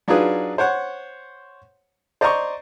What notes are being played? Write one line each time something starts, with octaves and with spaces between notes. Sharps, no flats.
F#3 D4 D#4 F4 G#4 B4
C5 C#5 F#5
C5 D5 D#5 A#5 C6 C#6